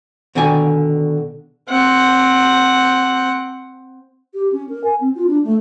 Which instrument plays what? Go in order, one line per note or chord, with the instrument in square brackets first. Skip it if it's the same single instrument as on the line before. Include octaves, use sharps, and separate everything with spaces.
[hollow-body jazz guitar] B2 D3 D#3 D5 G#5
[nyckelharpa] C4 F#5
[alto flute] G4
C#4
A#4
G#5
C4
F4
D4
A3